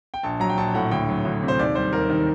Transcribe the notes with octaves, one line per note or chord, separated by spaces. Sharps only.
G5
A#1 A5
F#3 A#5
G5
A#1 A5
A2 F#5
D2 G5
F#3
D2
C3
C5
D#2 D5
G3 C5
D#2 A#4
D#3